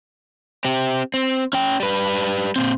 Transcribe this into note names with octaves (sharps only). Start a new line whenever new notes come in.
C4 G4
C4
C#4 G5
G3 B4
A#2 C4